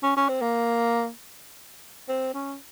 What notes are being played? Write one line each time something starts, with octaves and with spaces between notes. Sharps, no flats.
C#4
C#4
C4
A#3
C4
C#4